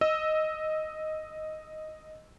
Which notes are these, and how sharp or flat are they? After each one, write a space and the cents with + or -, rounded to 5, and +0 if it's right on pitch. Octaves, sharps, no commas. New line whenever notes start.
D#5 +0 E6 -10